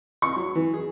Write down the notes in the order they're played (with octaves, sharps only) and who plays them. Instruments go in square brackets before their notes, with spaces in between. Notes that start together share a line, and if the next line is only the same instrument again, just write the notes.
[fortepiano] C#6
F#3
E3
G#4